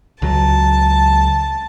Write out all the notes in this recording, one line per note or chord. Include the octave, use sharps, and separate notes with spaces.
C#2 F#3 A5